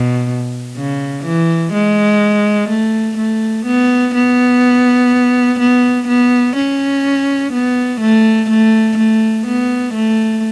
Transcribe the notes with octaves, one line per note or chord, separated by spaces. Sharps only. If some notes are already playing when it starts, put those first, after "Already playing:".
Already playing: B2
C#3
E3
G#3
A3
A3
B3
B3
B3
B3
C#4
B3
A3
A3
A3
B3
A3